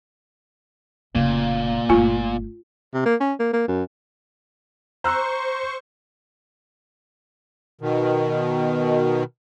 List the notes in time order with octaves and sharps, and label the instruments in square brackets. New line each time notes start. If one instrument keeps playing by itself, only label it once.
[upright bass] F1 C#3 [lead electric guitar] A#2 [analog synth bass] A#3
[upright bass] G1 A3 [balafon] F4 G#5
[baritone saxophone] C3
A#3
C#4
A#3
A#3
F#2
[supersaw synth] C5 C#6 [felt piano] A#5 E6 F#6
[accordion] B2 D#3